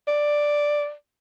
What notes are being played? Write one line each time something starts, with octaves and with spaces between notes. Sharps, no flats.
D5